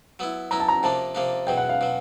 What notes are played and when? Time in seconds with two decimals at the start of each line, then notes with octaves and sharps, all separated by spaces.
0.19 F#3 B3 E4
0.51 F#3 B3 E4 A#5
0.60 A5
0.68 A#5
0.83 C3 F3 A#3 D4 A5
1.15 C3 F3 A#3 D4
1.47 E2 B2 F#3 G5
1.58 F#5
1.69 F5
1.81 B2 F#3